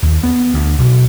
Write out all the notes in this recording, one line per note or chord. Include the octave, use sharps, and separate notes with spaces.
D#2
B3
D2
B1